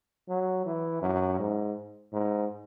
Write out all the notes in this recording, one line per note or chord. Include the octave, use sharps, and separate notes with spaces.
F#3
E3
F#2
G#2
G#2